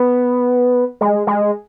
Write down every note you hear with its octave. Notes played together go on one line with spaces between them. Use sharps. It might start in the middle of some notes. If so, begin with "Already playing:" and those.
Already playing: B3
G#3
G#3